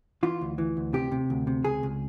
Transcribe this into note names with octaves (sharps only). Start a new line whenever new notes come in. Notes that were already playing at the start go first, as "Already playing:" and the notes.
E3 F4
D2
E3
D2
C3 G4
C3
D2
C3
C#2 G#4
C#2